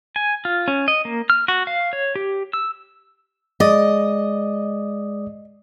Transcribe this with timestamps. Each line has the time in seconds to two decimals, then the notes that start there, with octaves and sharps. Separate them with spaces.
0.16 G#5
0.45 F4
0.68 C#4
0.88 D#5
1.05 A#3
1.30 F6
1.48 F#4
1.67 F5
1.93 C#5
2.16 G4
2.53 E6
3.60 G#3 D5 D#5 D#6